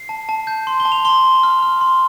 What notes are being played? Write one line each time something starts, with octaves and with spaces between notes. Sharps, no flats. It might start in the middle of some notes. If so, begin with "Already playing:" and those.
Already playing: C7
A5
A5
G6
C6
G7
A5
F7
C6 G7
C6
F6
F6
C6